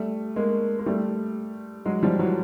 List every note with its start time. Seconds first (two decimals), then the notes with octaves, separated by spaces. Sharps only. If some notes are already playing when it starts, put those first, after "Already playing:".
Already playing: G3 A3
0.36 G#3 A#3
0.79 A#3
0.86 G3 A3
1.86 F#3 G#3
2.03 F3 G3
2.19 E3 F#3